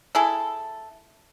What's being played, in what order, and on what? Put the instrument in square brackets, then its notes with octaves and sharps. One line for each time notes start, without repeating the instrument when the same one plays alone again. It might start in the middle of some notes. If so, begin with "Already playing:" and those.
[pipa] E4 G#4 A4